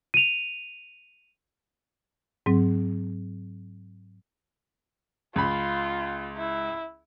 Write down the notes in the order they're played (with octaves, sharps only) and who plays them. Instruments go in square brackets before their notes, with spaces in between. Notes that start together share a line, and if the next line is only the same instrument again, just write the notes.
[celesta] D#7 F7
[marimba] G#2 F#3 C4
[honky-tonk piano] C#2 B5 [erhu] F4
[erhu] E4